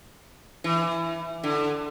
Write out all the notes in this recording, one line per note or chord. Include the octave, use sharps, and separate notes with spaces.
E3
D3